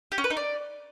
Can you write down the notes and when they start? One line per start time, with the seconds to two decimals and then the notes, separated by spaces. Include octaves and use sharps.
0.12 G4
0.18 C#4
0.24 B4
0.30 D#4
0.37 D5